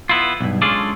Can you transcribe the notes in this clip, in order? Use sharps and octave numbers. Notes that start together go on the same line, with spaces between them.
B3 E4 F4
B1 G2
G#3 C#4 D4 F4 A4 D5